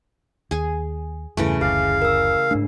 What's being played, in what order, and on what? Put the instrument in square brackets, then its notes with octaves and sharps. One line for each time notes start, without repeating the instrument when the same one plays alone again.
[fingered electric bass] D#2 [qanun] G#4 G#5
[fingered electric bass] E2 G2 [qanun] C#3 E3 A3
[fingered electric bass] F#1 D2 [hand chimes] G#4 [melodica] F5
[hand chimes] A#4 E6
[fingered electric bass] G#2 A3 [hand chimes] D4